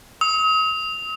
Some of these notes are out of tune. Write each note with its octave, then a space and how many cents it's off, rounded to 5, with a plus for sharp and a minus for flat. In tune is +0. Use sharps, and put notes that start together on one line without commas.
D#6 +40